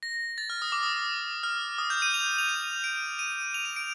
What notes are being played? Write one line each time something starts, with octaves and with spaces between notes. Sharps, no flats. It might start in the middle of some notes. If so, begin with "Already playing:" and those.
A#6
A6
F6
D#6
D6
D#6
F6
D#6
G6
D#7
F7
F7
D#7
D7
D#7
F7
D#7
D7